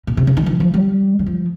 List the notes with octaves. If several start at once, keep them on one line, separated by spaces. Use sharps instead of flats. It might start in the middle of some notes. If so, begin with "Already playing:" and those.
A#2
C3
C#3
D#3
F3
F3
G3
D#3
F3